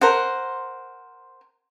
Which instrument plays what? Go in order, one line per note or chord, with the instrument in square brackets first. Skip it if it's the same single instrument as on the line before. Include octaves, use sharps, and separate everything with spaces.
[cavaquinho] A#4 C5 F#5